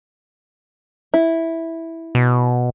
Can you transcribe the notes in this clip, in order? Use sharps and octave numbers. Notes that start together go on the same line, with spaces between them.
E4
B2